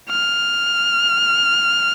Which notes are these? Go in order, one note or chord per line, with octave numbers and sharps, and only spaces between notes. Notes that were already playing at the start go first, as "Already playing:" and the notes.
F6